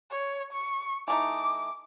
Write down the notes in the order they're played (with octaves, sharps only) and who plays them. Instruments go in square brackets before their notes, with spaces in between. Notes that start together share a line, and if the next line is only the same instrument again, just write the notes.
[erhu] C#5
C#6
[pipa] E3 A3 D#4 [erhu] D6